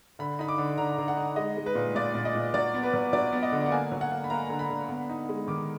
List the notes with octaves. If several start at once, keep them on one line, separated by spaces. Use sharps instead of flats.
D3 B5
D#4 B5
D6
D3
D3 A#5
D3
F#5
D#4
G#3 D#5
G#3
B4
A#2
A#2 D5
A#2
D#5
A#2
F#3 D5
B3
B4
F#3
F#3 D5
B3
D#5
D3
F#5
A#3 G#5
F#3
F#5
A#3
B5
A#3 A#5
D3
B5
D3
B3
D#4
G#3
D#3 D6